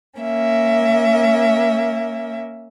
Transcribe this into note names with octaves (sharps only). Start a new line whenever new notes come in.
A#3 C#4 E5